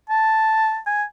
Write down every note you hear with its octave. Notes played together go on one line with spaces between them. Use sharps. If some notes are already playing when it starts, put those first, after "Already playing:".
A5
G#5